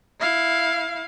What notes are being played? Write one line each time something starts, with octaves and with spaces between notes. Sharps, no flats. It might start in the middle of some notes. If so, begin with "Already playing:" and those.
E4 F5